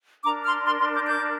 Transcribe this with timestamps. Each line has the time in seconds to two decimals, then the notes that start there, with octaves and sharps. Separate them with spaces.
0.24 D4 A#4 A#5 D6
0.45 C6 F6
0.66 C6 F6
0.80 C6 F6
0.94 D6 G6
1.08 D6 G6